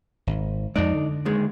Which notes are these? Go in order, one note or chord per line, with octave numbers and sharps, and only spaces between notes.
G#1
F2 G#3 D#4 D5
D3
D#2 D#3 G#3